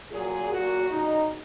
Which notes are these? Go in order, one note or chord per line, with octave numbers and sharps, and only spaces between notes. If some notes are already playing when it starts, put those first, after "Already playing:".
A#2 F#3 G#4
A#2 F#3 F#4
E2 C#3 F#3 D#4